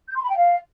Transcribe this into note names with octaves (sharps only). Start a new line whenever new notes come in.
G6
C6
B5
G5
F5